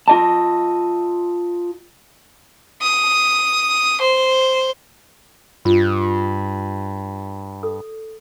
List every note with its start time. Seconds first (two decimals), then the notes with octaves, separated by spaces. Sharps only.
0.08 F4 D#5 A5
2.81 D#6
4.00 C5
5.65 G2 F4
7.63 A4 D#6